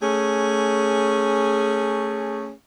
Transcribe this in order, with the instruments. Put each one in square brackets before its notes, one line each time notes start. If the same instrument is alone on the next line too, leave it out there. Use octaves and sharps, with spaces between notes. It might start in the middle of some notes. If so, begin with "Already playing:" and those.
[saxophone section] A3 C#4 G#4